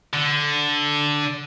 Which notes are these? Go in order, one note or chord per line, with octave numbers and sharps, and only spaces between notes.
D3